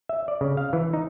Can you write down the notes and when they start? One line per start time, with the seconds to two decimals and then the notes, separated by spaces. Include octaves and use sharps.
0.09 E5
0.28 D5
0.41 C#3
0.57 F5
0.73 E3
0.93 D#4